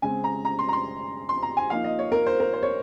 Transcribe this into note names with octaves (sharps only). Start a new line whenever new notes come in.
C#3 G#3 C4 G#5
A#5
A#5
C6
A#5
C6
C6
A#5
G#5
F3 A#3 D#4 F5
D#5
C#5
A#4
C5
A#4
C5
C#5